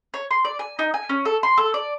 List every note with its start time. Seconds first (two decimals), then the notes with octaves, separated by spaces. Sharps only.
0.14 C#5
0.31 C6
0.45 D5
0.59 G#5
0.79 D#4
0.94 G#5
1.09 C#4
1.25 A4
1.43 C6
1.57 A4
1.74 D5